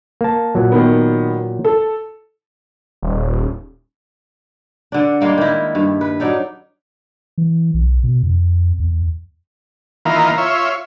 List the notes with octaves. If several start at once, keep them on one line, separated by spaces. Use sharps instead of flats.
A#3 A5
A#2 F#3
D#3 B3
A4
D#1
D3 D4
G3 G#3 A#3 D4
D#3 E4
G2
B4
F#3 D4 D#4 A4
E3
B1
B2
F2
E2
D#3 E3 A#3 F4
F4 C#5 E5